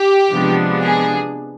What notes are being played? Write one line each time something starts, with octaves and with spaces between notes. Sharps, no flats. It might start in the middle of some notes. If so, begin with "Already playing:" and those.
Already playing: G4
C3 F3 G#3 B3 D4
G#4